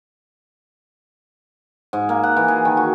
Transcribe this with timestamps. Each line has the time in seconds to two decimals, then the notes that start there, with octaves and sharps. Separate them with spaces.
1.93 G#2
2.09 A#3
2.24 F#5
2.37 E3
2.48 G#4
2.65 D#3
2.77 F#4